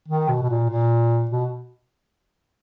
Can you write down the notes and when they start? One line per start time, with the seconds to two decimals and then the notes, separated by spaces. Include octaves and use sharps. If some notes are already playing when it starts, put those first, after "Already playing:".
0.08 D#3
0.28 B2
0.42 B2
0.50 A#2
0.70 A#2
1.31 B2